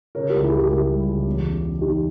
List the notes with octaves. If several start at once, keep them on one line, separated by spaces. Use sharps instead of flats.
C#3 A#4 C#5
C#2 G4 A#4
E4 G#4
C#2 G4 A#4
C#2 G4 A#4
G3
C#2
E2
C#3
C#3
E2 D#4 G4